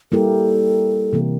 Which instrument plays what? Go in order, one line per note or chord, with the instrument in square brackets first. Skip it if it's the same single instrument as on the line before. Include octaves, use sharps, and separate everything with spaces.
[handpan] G3 A#3 E4 G4 A#4 [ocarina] A4
[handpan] C3 E3 A#3